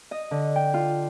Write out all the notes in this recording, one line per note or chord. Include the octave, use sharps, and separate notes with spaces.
D#5
D3
G5
F4